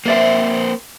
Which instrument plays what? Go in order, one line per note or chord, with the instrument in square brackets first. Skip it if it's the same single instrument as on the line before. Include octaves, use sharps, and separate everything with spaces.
[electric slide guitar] A#3 C4 C5 [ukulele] B4 D5 E5